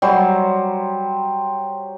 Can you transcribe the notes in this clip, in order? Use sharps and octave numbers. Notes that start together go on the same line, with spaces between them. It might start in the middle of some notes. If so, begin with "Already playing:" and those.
F#3 G3 C5